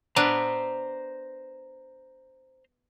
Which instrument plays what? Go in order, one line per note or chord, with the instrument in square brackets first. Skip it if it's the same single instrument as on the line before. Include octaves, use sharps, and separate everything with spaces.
[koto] B3 D4 B4 [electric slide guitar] C5 A#5